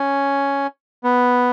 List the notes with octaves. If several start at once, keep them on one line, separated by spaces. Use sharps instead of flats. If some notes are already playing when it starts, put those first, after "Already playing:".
Already playing: C#4
B3